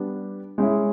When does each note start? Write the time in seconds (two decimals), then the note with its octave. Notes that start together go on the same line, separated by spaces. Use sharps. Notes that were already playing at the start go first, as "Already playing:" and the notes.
Already playing: G3 B3 D4
0.58 G#3 C#4 E4